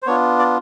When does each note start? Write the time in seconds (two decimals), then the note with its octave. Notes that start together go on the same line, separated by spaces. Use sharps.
0.02 C5
0.06 B3 D4 F4 C#5
0.39 D5